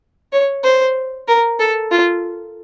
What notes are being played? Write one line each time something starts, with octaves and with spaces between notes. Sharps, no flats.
C#5
C5
A#4
A4
F4